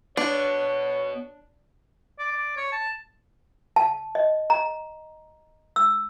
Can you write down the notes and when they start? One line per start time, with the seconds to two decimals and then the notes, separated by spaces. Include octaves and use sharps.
0.17 B2 B3 D4 C#5
2.19 D5
2.31 D5
2.57 C#5
2.72 A5
3.76 A5
4.15 D#5
4.50 A#5
5.76 E6